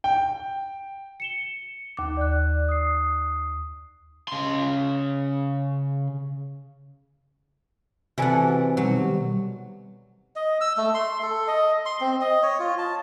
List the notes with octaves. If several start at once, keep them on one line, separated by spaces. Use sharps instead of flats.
G5
C#7 E7 G7
D#2 D6
D5 F#6
D#6 C7
C#3 C6
C3 E3 F#4 A4 B4 D5 F#5 G#5
B2 D#3 F#3 G3
D#5
E6
A3
C6
A4
D#5
C6
C4
D#5
C#5
F4
A5